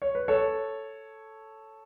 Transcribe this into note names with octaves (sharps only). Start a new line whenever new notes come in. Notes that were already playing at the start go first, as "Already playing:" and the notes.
C#5
B4
A4 C#5